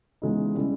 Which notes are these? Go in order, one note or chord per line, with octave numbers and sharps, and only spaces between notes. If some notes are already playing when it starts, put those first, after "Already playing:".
C#3 E3 G#3 B3 D#4
C#3 G3 C#4 E4 G#4